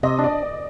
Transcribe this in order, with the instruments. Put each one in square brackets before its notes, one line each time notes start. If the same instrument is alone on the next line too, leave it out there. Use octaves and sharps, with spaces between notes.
[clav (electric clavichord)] C3 [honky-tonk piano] D#5
[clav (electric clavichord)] D4
[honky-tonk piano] D5